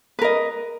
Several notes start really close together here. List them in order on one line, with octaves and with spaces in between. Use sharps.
B4 A#4 D#5